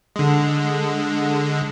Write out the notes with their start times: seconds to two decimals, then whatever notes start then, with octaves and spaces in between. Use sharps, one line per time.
0.16 D3 G#3